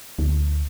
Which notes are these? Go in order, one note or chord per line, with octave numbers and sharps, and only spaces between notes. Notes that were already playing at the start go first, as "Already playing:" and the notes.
D2